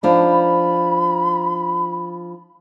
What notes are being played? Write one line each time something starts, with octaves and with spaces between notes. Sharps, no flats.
F3 D4 D#4 B5